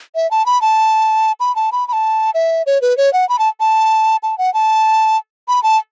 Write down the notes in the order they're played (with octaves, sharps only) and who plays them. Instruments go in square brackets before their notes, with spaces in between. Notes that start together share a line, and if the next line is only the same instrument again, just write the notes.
[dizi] E5
A5
B5
A5
B5
A5
B5
B5
A5
E5
C#5
B4
C#5
F#5
B5
A5
A5
A5
F#5
A5
B5
A5